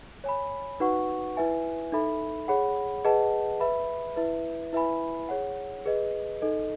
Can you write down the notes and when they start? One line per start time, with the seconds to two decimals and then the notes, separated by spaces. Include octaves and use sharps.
0.24 C#5 G#5 B5
0.80 D#4 F#4 B4 F#5 C#6
1.37 E4 B4 E5 G#5
1.92 D#4 A4 E5 B5
2.48 G#4 C#5 F#5 B5
3.05 G#4 B4 D#5 F#5 A5
3.60 B4 E5 B5
4.16 E4 B4 E5
4.73 E4 B4 E5 G#5 B5
5.29 G#4 C#5 F#5
5.86 G#4 B4 D#5
6.42 D#4 A4 D#5